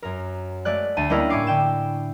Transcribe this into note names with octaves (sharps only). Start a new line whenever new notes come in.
F#2 A#4
G#3 A3 D5 F#6
D2 A5 D#7
G3 A#3 C#4 E4 A#4 D#5
A2 G#5 C#6 D6 C7
D3 G5 E7